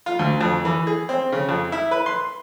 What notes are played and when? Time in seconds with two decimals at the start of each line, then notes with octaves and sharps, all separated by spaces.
0.06 F4
0.19 D2
0.41 F2
0.65 E3
0.87 G#4
1.09 C4
1.32 C#3
1.49 F2
1.72 E4
1.91 B4
2.06 C6